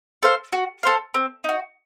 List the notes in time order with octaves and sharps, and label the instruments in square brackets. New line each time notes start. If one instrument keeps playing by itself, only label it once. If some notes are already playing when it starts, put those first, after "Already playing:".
[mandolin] A4 C5 F5
F#4
A4 C5 F5
C4
D#4 F#4